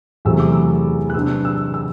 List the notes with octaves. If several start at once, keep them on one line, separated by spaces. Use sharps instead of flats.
E2 C3 F#3 A3 E6
D6
E6
F#6
C3 F#3 B3 D4 E6
E6
E6